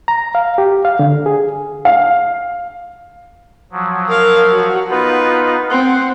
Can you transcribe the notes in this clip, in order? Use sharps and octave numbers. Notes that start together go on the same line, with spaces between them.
A#5
F5
G4
F5
D3
G#4
F5
F3 F#3
A#4 F5
F#4
B3 D#4 F4 B4
C4 F#5 C6